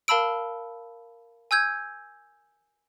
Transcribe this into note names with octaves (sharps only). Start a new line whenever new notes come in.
A#4 F5 A5 B5 E6 D7
G#5 E6 G6 G#6